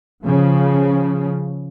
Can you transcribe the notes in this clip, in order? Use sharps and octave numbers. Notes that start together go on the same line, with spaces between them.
C#3 F3